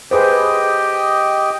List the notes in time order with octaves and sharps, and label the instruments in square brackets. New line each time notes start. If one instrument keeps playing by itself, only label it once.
[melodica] G4 D#5 G5 [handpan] G#4 B4 C5